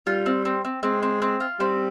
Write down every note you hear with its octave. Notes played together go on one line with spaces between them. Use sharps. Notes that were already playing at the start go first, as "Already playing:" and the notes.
G3 F4
C4
C4
C4
G#3 C4
C4
C4
F4
G3 C4